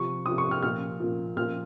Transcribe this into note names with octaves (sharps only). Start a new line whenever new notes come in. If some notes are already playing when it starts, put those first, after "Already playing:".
Already playing: C3 F3 C#6
C3 F3 D#6
C#6
F6
A#2 F3 F6
A#2 F3
A#2 F3 F6